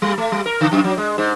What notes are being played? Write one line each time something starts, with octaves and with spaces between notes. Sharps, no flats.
G3
A3
G3
A#4
D3
F#2
F#3
G#3
G#2